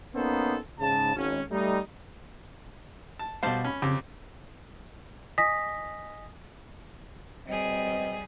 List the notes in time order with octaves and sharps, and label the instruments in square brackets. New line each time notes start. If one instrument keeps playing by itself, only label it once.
[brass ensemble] A#3 B3 C#4 D#4 A4 C5
G#2 C#3 A5
G#1 C#4
G3 A3 D#4
[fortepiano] A5
[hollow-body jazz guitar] B2 F5 [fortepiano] G3 C5 A5
[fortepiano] C#4 B5
[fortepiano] F2 G4 [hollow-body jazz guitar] C#3
[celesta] D#5 G#5 D#6 A#6 B6
[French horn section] B2 C4 D#5 [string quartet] G3 G#4